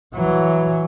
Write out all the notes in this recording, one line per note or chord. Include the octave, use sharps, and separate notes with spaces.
E3 F#3